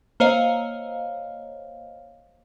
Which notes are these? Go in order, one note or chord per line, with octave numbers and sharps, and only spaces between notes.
A#3 C5 C#5 D#5 F5